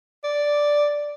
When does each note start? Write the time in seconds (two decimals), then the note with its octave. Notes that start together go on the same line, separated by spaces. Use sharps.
0.24 D5